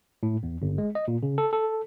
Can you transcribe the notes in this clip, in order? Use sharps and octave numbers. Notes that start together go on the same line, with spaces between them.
A2
E2
G1
G#3
D#5
A#2
C#3
A4
A4